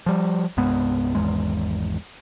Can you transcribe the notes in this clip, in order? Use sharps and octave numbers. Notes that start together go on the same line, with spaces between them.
F3 G3
C2 G2 G#3 B3
G#1 E2 G#3